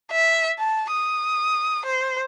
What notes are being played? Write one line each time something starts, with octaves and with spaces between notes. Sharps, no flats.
E5
A5
D#6
C5